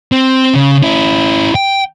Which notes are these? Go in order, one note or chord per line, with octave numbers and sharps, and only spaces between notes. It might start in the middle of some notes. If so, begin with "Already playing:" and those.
C4
C#3
C#4 E4
G5